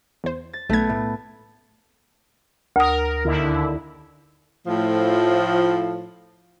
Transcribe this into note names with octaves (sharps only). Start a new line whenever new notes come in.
E2 C5
A6
B1 A3 B3 G#6
A2
D2 A#4 D#6
D#2 D3 E4
A2 F3